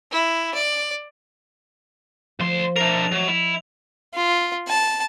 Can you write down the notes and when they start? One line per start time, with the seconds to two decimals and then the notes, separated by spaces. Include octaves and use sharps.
0.12 E4
0.55 D5
2.40 D2 F3 C6
2.76 D4 A#4 E5 A#6 C7 F7
2.95 D#5
3.12 F#3
3.28 E4 B6
4.15 F4
4.68 A5